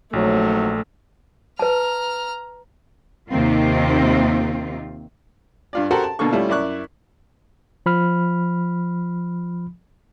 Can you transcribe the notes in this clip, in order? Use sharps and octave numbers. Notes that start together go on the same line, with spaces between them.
A#1 C3 D#3 F#3 A3
B4 A5 A#5 F6
D#2 C3 D#3 C4 F4
G2 F4 D5
F#4 G4 A4 A#4 C5 F#5
A5
B2 D3 A#3 A4 C#6
G3 A3 C#4 E4 F4
F#2 E4 D5 C#6 F#6
F3 B5 F6